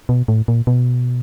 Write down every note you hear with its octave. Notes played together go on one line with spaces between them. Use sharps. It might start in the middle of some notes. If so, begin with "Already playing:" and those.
B2
A2
A#2
B2